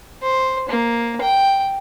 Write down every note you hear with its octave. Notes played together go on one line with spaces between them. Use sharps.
C5
A#3
G5